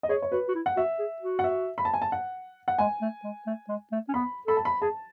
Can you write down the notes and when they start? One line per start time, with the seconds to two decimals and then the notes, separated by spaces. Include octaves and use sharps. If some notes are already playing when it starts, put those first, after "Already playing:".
0.03 D#5
0.09 G#4 C#5
0.22 C#5
0.32 F#4 B4
0.48 F#4
0.55 E4
0.66 F#5
0.76 F#4 E5
0.99 G#4
1.22 F#4
1.39 F#5
1.44 E5
1.78 B5
1.85 A5
1.94 G#5
2.02 A5
2.12 F#5
2.68 F#5
2.79 G#3 G#5
3.01 A3
3.24 G#3
3.46 A3
3.69 G#3
3.92 A3
4.08 C#4
4.14 B3 B5
4.47 A4 B5
4.57 A5
4.65 B5
4.82 G#4 A5